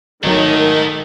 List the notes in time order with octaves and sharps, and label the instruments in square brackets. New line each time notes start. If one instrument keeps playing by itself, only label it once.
[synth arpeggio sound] G#1 B2 F#3 [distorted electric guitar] G#2 [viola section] D#3 [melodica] A3 D#4